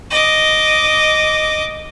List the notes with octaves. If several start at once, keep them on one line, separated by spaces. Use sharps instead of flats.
D#5 D6